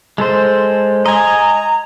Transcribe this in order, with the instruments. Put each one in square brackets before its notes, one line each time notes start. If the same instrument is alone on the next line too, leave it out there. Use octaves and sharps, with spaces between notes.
[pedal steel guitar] G#3 A4 C5
[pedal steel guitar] D#5 G#5 [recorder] A#5